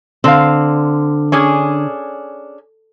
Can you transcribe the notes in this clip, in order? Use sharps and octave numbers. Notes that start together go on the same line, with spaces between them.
D3 C4 F5
C#4 D4 G#4